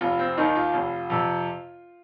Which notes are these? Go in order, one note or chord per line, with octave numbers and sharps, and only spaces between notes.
F1 F4
C4
D#2 D#3 D#4
F4
F1
F2 C3